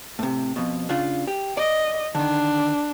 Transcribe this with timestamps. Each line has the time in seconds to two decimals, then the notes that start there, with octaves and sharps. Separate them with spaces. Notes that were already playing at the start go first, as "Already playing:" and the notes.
0.19 A2 C3
0.56 F2 B2
0.89 C#3 D4 F4
1.27 G4
1.57 D5 D#5
2.15 D3 D#3 D4